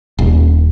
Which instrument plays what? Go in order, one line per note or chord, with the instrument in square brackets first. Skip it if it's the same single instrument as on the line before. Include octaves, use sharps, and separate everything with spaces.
[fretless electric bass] D#1